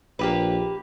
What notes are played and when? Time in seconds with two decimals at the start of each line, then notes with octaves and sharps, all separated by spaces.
0.19 A#1 A#3 G4 B4